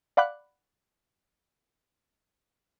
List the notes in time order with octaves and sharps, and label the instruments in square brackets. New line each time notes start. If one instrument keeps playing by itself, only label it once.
[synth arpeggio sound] D5 F5 F#5 B5 D6 F#6